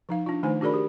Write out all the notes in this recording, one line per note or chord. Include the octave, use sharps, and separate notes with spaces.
F3 D#4 F5
D4 F4
D#3 A3 D#4 C5 G#5
D4 F#4 G#4 A#4 D5 B5
G4